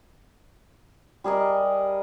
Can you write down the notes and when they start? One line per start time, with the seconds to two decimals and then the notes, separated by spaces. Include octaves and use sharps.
1.24 G3 G#4 A#4 D#5